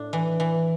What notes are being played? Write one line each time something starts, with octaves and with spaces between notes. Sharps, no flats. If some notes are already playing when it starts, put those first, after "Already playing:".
Already playing: A2 D4
E3
E3